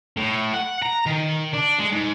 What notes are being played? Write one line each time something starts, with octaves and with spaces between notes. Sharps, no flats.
A2
F#5
A#5
D#3
D4
G#3
G#2